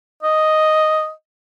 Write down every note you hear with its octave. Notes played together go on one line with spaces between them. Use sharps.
D#5